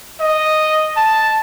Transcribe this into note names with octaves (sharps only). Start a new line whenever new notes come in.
D#5
A5